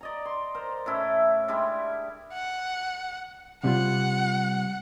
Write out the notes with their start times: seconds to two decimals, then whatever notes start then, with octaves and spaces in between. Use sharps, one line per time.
0.01 D5 D#5 A#5
0.25 C6
0.55 A#4 C5
0.86 A2 C#4 E4 A4
1.48 G3 G#3 D4 E4
2.33 F#5
3.64 C3 G3 F4 F#5